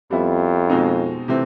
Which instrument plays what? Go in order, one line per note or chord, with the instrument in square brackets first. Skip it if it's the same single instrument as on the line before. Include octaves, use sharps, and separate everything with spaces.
[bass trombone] F2 [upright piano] G3 B3 E4
[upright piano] B2 G#3 C4 D#4
C3 E3 A3 C4